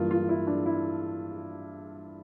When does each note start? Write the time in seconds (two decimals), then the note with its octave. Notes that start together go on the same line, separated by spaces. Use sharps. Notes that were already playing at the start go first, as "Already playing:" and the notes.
Already playing: G2 E3 A#3 F4
0.11 F4
0.29 E4
0.47 D4
0.66 E4